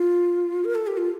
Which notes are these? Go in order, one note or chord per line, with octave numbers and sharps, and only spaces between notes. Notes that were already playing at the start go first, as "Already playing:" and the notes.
Already playing: F4
A#4
A4
G4
F4